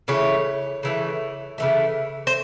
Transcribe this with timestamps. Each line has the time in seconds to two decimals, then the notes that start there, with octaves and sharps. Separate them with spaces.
0.08 C#3 E3 A3 C#5
0.83 C#3 E3 A3
1.58 C#3 E3 A3
2.27 C5